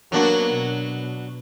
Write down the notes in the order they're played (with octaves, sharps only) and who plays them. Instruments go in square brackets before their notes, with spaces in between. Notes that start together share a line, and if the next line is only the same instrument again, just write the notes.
[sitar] F#3 D4 F#4 [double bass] A#3 B3
[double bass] B2